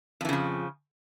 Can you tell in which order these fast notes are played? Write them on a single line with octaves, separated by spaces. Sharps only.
F2 E3 C#3 F3